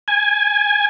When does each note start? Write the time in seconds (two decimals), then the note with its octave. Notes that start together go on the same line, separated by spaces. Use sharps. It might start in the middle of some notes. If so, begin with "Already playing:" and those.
0.08 G#5